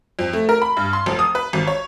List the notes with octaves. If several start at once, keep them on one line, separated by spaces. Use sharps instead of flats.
F2
A3
A#4
B5
G2
C6
F1
D#6
B4
G#1
C#5